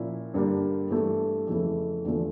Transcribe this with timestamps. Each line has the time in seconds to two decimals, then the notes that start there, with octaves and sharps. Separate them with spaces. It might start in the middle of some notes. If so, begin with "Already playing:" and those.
Already playing: A#2 F3 C#4 E4
0.34 G2 D3 G3 A#3 D4
0.90 G2 E3 A3
1.47 F2 C#3 E3 A3 E4
2.05 E2 D3 F3 A3